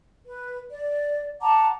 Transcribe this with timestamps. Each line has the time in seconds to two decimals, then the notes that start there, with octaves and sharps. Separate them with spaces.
0.26 B4
0.71 D5
1.42 F#5 A5 A#5 D6